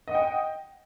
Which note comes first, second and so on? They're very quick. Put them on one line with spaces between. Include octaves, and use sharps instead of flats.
D#5 F#5 G5